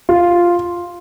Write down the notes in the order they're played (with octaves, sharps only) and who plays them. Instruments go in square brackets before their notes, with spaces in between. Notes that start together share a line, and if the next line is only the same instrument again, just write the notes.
[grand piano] F4